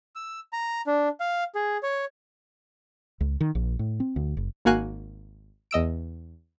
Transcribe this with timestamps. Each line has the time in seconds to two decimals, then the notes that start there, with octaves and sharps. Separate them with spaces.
0.16 E6
0.53 A#5
0.87 D4
1.20 F5
1.55 G#4
1.83 C#5
3.21 C#2
3.41 D#3
3.55 A#1
3.79 A2
4.00 C4
4.16 D2
4.37 F#1
4.65 G#1 A#3 F#4 F5 G#5 F#6
5.71 E2 D#5 E6 D7